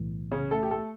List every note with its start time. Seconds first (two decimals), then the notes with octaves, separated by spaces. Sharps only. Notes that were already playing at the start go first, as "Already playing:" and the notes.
Already playing: B1 A2 E3
0.31 C#3 C#4
0.51 A3 A4
0.63 G4
0.71 A3 A4